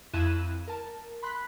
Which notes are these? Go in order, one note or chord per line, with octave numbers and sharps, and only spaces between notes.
F2 E4 F#6 G#6 D#7 E7
A#4 A5
B5 C6 F#6 B6